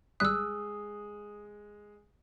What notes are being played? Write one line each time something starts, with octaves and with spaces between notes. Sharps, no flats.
G#1 G3 G#3 D#6 E6 F#6 B6